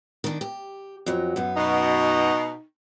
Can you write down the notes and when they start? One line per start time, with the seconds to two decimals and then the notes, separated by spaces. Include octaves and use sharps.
0.24 D#3 D4
0.41 G4
1.06 F2 F#3
1.36 F#2 B3
1.56 B2 D#4